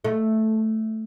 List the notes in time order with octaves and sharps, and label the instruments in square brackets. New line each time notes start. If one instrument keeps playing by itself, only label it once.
[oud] A3